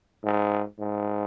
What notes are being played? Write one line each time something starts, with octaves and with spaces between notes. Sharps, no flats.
G#2
G#2